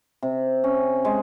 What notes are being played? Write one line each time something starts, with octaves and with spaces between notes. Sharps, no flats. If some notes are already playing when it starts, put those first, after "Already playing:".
C3
C#4
G#3